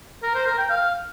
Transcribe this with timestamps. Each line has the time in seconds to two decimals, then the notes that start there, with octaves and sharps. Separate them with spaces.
0.23 A#4
0.35 C5
0.46 A#4
0.58 G5
0.70 F5